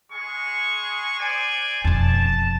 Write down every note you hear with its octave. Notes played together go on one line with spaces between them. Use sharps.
G#3 G#4 C#6
C5 D5 G#5
E1 F2 A5